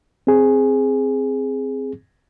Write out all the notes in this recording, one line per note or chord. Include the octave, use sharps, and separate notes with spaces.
C4 G#4